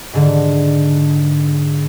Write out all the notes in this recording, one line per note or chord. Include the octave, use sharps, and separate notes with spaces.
G#2 D3